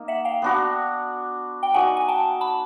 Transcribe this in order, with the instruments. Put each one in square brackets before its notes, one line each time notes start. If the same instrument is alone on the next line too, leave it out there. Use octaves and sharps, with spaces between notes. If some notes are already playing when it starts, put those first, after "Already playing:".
Already playing: [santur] A#3 D#4
[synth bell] E5 F#5
F5 G5
[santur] B3 D4 F#4
[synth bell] G5
[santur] D#4 F#4 A4 D5 [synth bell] F#5 G#5
[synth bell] G#5
G5 A5
A5 B5